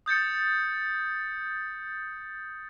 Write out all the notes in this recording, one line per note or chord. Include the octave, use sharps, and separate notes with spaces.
D#6 G6 A6 C#7